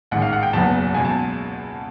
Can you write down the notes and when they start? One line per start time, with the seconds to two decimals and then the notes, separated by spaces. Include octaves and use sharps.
0.11 A1 G#2 D#3 F#5
0.22 F5
0.33 F#5
0.43 G5
0.53 F#1 E2 B2 F#3 B3 A5
0.94 C#2 B2 F#3 G#5
1.05 A5